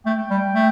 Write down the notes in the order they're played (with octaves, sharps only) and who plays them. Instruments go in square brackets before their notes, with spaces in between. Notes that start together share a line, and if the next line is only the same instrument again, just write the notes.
[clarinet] A3 [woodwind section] G5
[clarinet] G3
A3